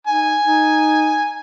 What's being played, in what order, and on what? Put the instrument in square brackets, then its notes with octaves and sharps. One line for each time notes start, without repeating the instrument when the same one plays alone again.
[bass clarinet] D#4 [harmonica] G#5
[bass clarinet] D#4